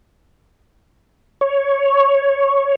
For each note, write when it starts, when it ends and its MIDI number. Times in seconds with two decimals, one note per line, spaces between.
1.41 2.75 73